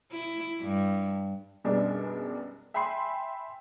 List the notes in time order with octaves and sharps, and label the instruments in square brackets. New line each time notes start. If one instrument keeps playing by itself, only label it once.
[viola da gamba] E4
G2
[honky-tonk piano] F#2 B2 G3 G#3 D4 D#4
E5 G5 G#5 B5 C6 C7